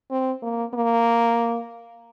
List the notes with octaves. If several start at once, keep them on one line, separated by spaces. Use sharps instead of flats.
C4
A#3
A#3